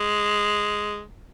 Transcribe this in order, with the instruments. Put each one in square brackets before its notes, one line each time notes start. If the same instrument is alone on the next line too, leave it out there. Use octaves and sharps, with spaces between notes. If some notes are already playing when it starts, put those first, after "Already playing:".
Already playing: [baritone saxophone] G#3